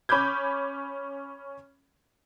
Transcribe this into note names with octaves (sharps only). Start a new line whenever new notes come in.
C#4 B5 D6 G6 G#6